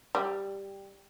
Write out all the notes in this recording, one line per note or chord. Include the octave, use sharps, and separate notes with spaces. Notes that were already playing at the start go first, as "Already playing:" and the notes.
G3